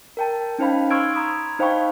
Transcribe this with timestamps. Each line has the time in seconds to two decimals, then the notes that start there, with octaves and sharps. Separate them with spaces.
0.17 A#4 G5 A5
0.59 C#4 D#4 C5 F5 B5
0.90 C6 C#6 E6 F6 G#6 D7
1.14 A#5 B5 D#6 G#6
1.59 D#4 C5 F5 G5 B5 C#6